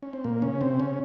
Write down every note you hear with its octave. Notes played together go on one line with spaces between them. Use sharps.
C#4
C4
A#2 A#3
C#3 C#4
C3 C4
C#3 C#4